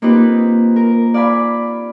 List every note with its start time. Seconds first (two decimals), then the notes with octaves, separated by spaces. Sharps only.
0.02 A#3 C4 D#4 F4 G4 B4
0.76 A#4
1.14 D5 F5 G#5 B5